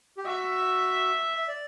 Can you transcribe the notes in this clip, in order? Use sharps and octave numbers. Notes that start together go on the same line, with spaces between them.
G4
F#4 E5
E5
D5